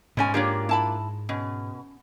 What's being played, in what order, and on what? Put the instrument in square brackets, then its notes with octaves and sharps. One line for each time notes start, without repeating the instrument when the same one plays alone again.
[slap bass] G#2 [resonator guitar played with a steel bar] B2 C#4 G#5
[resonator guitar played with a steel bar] A#3 D4 F4 [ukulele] G4 C#5
[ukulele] E4 A5 B5
[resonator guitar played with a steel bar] B2 [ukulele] C#4